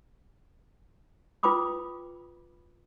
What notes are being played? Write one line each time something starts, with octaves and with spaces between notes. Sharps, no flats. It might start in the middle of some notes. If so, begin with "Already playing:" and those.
F4 B4 G5 B5 D6 D#6